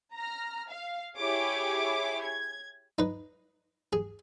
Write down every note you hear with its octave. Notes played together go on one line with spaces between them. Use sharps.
A#5 F6
F5
E4 G4 G#4 C#5 D6
G#6
D#4 B4
G#4